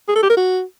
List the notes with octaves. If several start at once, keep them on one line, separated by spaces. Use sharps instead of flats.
G#4
A4
G4
A#4
F#4